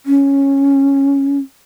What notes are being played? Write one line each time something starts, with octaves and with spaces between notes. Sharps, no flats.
C#4